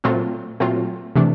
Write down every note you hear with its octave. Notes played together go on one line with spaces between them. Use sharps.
A#2 F#3 A3 C4 F4
A#2 F#3 A3 C4 F4
C3 E3 A3 D4